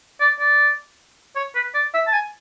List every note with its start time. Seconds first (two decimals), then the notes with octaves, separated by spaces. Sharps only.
0.21 D5
0.40 D5
1.36 C#5
1.56 B4
1.75 D5
1.94 E5
2.07 A5
2.13 G#5